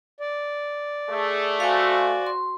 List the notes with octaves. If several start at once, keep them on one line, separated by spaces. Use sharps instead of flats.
D5
A3 G#4
F#4 C5 F5 G#5
C6